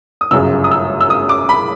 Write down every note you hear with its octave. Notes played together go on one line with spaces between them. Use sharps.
D#6
G1 F#2 C#3 E6
D#6
E6
E6
D#6
D6
B5